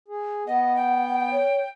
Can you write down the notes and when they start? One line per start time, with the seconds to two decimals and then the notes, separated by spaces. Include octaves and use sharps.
0.08 G#4
0.47 B3 D#5 F#5
0.76 G5
1.31 C#5